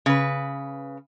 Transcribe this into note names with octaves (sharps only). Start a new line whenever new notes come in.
C#3 B4